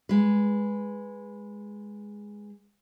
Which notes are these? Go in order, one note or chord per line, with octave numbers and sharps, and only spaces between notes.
G#3 B4